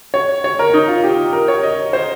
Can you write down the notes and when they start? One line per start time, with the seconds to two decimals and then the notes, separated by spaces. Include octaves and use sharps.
0.14 C#5
0.44 C#5
0.59 A#4
0.74 D#4
0.88 F4
1.04 G4
1.33 A#4
1.48 C#5
1.63 D#5
1.93 C5